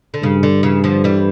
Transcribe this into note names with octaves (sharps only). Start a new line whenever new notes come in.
D3
G2 C#3
D3
C#3 E3
D3 F3
E3 G3